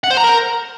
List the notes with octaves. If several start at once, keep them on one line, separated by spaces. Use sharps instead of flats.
F#5
C5
A#5
A#4